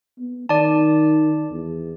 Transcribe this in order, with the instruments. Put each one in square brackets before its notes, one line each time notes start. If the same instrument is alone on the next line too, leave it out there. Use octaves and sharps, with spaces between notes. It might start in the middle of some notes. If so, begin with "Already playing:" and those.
[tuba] B3
[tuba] D#3 [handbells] D5 A5
[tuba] E2